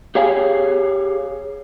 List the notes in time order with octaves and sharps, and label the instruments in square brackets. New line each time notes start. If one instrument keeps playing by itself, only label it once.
[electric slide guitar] G4 G#4 C#5 F5 G#5